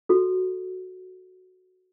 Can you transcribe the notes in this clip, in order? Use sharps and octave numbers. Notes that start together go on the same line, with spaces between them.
F#4 A4